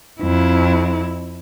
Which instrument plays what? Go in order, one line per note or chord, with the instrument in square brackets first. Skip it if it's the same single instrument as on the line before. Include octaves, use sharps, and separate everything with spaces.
[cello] F2 E4